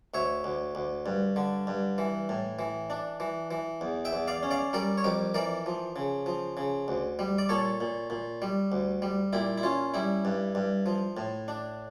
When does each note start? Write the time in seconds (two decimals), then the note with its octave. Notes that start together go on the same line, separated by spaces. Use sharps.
0.14 D2 C#5 E5
0.44 D2
0.75 D2
1.06 G2
1.36 D3
1.67 G2
1.98 E3
2.29 A2
2.59 E3
2.90 D4
3.20 E3
3.51 E3
3.81 E2
4.05 E5 G5
4.13 E2
4.28 D5 F5
4.43 C#4
4.51 D5 F5
4.73 G3 A#4 D5
4.98 C#5
5.04 F2 G4 A#4
5.34 E3 A#4 D5
5.66 F3
5.96 C#3
6.26 F3
6.57 C#3
6.88 D2
7.19 G3
7.38 D5
7.49 A#2 A4 C#5
7.81 A#2
8.10 A#2
8.42 G3
8.72 D2
9.02 G3
9.33 A#2 E4 G4
9.58 E4
9.63 C#4 F4
9.94 G3 E4
10.25 G2
10.55 G2
10.86 F3
11.17 A2
11.48 D4